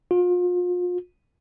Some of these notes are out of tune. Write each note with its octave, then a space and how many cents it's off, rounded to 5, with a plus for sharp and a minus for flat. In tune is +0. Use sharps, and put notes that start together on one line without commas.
F4 +35